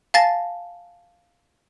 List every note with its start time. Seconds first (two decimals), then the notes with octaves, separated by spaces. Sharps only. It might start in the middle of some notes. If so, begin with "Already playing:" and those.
0.14 F5 G#5 A5 A6 A#6